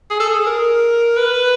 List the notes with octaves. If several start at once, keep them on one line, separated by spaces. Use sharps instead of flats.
G#4
A4
G#4
A#4
B4